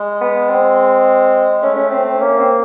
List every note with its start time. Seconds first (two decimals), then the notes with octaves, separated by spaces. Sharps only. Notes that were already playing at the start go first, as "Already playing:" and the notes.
Already playing: G#3
0.21 B3
0.49 C4
1.62 A3 C#4
1.76 C#4
1.91 C4
2.04 C4
2.20 A#3 C#4
2.38 C4